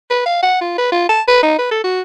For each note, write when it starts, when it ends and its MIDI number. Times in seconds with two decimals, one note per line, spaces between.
0.11 0.25 71
0.26 0.42 77
0.43 0.61 78
0.62 0.74 65
0.78 0.89 71
0.92 1.06 65
1.09 1.22 81
1.28 1.42 71
1.43 1.56 63
1.59 1.69 71
1.71 1.82 69
1.84 2.02 66